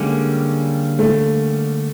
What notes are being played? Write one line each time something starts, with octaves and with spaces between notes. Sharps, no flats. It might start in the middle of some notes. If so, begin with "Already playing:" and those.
Already playing: D3 G3 G#3 A#3 C#4
A3